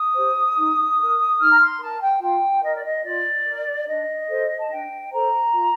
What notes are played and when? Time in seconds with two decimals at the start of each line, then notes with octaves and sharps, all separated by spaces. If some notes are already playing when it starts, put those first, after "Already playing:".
Already playing: D#6
0.15 G4 C5
0.56 D#4
0.97 A#4
1.39 D#4 F6
1.49 A#5
1.60 C6
1.80 A#4 A5
2.01 G5
2.21 F4 G5
2.62 A#4 D#5
2.73 D5
2.84 D#5
3.04 F4 D5
3.46 A#4
3.87 D4 D#5
4.28 A4 C5
4.58 A5
4.70 D4 G5
5.11 A4 C5 A#5
5.53 F4